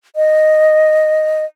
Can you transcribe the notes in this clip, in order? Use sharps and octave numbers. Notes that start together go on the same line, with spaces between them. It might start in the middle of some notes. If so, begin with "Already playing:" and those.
D#5